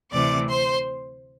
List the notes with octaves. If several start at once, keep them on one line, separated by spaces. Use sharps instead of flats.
D2 C3 E3 A3 C4 D5 D6
C5 C6